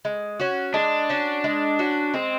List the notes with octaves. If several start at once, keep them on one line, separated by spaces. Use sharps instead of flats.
G#3
C#4 F#4
G#3 D4
C#4 F#4
G#3
C#4 F#4
G#3 C4